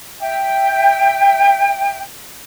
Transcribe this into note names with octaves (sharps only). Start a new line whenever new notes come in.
E5 G5